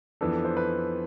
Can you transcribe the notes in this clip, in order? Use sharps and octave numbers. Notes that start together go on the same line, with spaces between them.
F2 E3 B3 D4 A4
A4
C5
B4